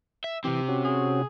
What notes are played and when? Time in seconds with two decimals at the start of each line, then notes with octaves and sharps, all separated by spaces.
0.24 E5
0.44 C3 E3 C4 G4
0.68 C#4 F#4
0.84 G#4